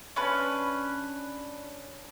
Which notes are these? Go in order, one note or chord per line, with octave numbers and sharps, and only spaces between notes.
C#4 D4 B4